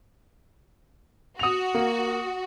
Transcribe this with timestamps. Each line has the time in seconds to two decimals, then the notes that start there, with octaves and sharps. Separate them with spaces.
1.39 F#4 D#6 F7
1.74 A#3